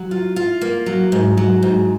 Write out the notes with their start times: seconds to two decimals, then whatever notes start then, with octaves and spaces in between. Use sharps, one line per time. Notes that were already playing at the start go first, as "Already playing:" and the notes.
Already playing: F#3
0.11 F4
0.36 F4
0.61 A#3
0.86 F#3
1.12 G#2
1.37 F#3
1.63 G#2